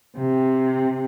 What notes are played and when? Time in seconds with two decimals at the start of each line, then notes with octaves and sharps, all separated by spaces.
0.17 C3